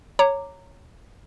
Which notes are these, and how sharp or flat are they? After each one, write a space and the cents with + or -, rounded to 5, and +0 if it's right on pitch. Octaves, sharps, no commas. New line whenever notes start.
C#5 +0 A#5 -15 D6 +0